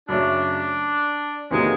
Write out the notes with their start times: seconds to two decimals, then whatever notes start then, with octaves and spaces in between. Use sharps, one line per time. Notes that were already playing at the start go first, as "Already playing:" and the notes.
0.09 F#2 C#3 F#3 A3 D4
1.51 E2 C3 D#3 F#3 G#3 A#3